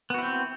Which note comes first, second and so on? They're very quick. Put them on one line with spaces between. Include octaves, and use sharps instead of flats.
B3 F#4 E4 C4